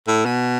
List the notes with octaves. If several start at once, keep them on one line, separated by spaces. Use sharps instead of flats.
A2
B2